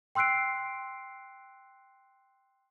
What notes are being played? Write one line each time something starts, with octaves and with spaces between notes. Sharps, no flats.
G5 C6 E6 F#6 C7 D7